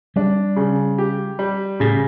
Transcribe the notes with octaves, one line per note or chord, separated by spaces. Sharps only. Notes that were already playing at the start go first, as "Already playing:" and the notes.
G3 D4
C#3
G4
G3
A2 C#3